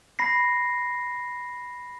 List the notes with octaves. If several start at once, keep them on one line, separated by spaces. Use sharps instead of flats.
B5 A#6 C7